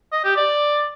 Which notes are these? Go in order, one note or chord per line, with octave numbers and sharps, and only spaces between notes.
D#5
G4
D5